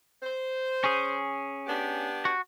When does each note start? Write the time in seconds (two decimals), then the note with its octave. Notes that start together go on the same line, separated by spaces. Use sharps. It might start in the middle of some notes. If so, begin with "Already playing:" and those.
0.23 C5
0.84 C#4 G#4
1.66 B3 D4 G4
2.25 F#4